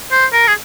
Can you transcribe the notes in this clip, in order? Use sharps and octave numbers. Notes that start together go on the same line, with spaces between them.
C5
A#4
G#4